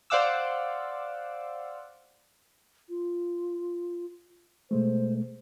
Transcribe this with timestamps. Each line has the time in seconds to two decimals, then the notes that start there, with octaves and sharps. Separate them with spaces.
0.10 C5 D5 F5 F#5 D6 E6
2.90 F4
4.71 B2 G#3 A3 C5